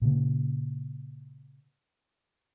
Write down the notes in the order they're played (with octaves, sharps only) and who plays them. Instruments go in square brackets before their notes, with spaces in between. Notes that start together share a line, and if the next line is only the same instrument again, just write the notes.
[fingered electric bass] A#2 C#3 A#3